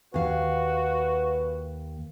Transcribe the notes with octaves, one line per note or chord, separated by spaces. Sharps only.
D#2 F#4 B4 F5